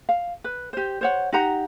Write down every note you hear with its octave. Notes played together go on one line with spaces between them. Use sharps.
F5
B4
G4 C5
C5 C#5 F#5
D#4 G4 F#5 A#5